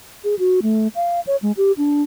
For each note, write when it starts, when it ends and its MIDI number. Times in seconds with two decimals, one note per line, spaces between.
0.24 0.35 68
0.39 0.60 66
0.62 0.88 57
0.96 1.20 77
1.27 1.36 73
1.42 1.52 56
1.57 1.72 67
1.77 2.03 62